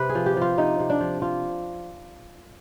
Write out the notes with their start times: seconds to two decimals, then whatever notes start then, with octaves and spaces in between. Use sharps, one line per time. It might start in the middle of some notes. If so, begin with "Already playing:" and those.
Already playing: C3 B4
0.09 G#4
0.15 F3
0.26 G4
0.37 F3 F4
0.58 C3 D#4
0.79 C3
0.90 D4
1.01 F3
1.22 F3 F4